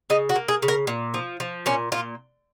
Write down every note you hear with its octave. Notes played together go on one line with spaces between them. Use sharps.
C#3 D#4
F#4
A#3
G#4
C#3
A#4
A#2
F3
F3
A#2 C#4
A#2 F4